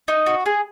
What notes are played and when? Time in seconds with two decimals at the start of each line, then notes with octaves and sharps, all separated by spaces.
0.08 D#4
0.26 F#4
0.46 G#4